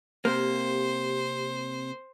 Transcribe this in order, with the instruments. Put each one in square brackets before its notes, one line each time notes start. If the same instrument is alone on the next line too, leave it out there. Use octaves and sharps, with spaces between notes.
[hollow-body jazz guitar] C3 A#3 [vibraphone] G4 [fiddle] C5